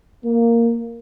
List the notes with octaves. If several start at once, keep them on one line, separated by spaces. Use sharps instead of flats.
A#3